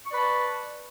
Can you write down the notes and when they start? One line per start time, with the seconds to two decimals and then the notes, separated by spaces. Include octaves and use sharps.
0.06 C#6
0.09 D5
0.11 B4
0.14 B5
0.17 A5